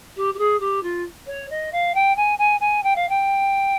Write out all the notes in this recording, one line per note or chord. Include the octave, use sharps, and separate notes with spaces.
G4
G4
G#4
G4
F4
C#5
D#5
F5
G5
G#5
G#5
G#5
G5
F5
G5